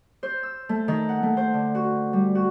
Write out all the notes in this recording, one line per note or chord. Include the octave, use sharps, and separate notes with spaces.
C5
E6
A3
D#3
F#5
A3
C5
D3
F#4
G3
F#4